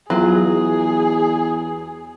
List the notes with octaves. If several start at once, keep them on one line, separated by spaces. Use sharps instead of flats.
E2 F#3 F4 G#4